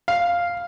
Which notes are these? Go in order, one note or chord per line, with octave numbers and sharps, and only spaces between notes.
F5